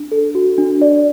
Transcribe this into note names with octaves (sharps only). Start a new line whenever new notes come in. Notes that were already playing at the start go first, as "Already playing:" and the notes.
Already playing: D4
A4
F#4
D4
D5